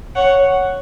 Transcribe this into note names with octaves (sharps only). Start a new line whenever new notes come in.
C#5 F#5